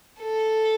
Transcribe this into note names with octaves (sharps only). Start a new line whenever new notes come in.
A4